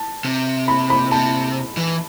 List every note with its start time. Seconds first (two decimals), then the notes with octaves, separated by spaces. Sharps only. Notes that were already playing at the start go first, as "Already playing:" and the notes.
Already playing: A5
0.25 C3
0.68 B5
0.90 B5
1.12 C3 A5
1.77 E3